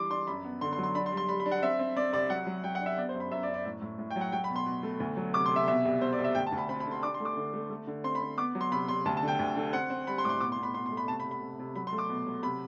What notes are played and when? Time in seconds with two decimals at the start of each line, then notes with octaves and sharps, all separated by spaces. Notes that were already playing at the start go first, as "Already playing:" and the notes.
Already playing: E3 G3 D4 C6 D6
0.11 D4 C6
0.27 F#2 B5
0.44 B3
0.61 D3 C6
0.73 C6
0.78 F#3
0.83 C6
0.95 D4 B5
1.06 C6
1.12 G3
1.17 C6
1.29 G3 B5
1.40 B5
1.46 D4
1.51 F#5
1.62 C4 E5
1.79 C4
1.96 C4 D5
2.13 C2 D5
2.30 F#3 F#5
2.46 F#3
2.64 F#3 G5
2.75 F#5
2.81 D4
2.86 E5
2.98 B3 D5
3.09 C5
3.14 F#2
3.20 B5
3.31 F#2 E5
3.43 D5
3.48 F#2
3.54 D5
3.65 A2
3.82 A2
3.99 A2
4.10 G5
4.16 F#3
4.21 F#5
4.32 F#3 G5
4.44 B5
4.50 B2
4.56 C6
4.66 B2
4.83 A3
5.00 D2
5.17 F#3
5.34 C3 D6
5.46 C6
5.51 C3 E5
5.68 B2 E5
5.85 C2
6.01 B2 C5
6.13 D5
6.19 C2
6.24 E5
6.35 D2 G5
6.47 A5
6.52 D2
6.58 B5
6.69 C4 B5
6.80 B5
6.86 D3
6.91 C6
7.02 D4 D6
7.14 C6
7.20 A3
7.25 D6
7.37 D3
7.53 A3
7.70 A3
7.87 D3
8.04 C4 C6
8.15 B5
8.21 C4
8.38 B3 D6
8.55 F#3
8.61 C6
8.72 C3 B5
8.88 C3 C6
9.05 D2 A5
9.17 A5
9.23 D3 G5
9.39 D2
9.56 D3
9.73 C4 F#5
9.90 C4
10.07 G3 B5
10.18 C6
10.24 A2 D6
10.29 C6
10.40 B2 D6
10.52 C6
10.57 B2
10.63 B5
10.74 B2 C6
10.86 C6
10.91 A3
10.97 B5
11.08 C3 A5
11.20 B5
11.25 C3
11.31 B5
11.42 C3
11.59 C3
11.75 F#3 B5
11.87 C6
11.93 A3
11.98 D6
12.09 B2
12.27 F#3
12.43 C3 B5